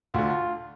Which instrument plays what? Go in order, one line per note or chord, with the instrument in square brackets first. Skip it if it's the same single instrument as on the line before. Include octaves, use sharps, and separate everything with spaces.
[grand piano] D2 D3 [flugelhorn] F4